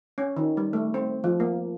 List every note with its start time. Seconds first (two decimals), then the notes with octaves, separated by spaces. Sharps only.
0.18 C#4
0.37 D#3
0.57 G3
0.73 A3
0.94 C4
1.24 F3
1.40 A#3